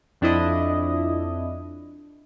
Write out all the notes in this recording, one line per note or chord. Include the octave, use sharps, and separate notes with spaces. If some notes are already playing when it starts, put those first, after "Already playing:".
F2 D4 E4 D#5